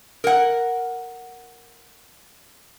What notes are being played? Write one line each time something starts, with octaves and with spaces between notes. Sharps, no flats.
A#4 F#5